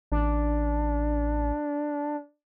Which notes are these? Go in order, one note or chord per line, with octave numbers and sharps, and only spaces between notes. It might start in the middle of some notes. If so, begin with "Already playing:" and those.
A1 D4